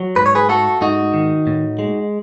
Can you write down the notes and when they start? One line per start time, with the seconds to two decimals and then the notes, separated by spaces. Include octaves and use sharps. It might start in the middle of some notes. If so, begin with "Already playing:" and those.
Already playing: F#3
0.16 G#2 B4
0.26 C#5
0.35 G#4 B4
0.49 A3 F#4 A4
0.81 G#2 D#4 F#4
1.14 D#3
1.47 A2
1.79 G#3